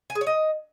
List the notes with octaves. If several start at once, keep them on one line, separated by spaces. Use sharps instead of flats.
G#5
G#4
C#5
D#5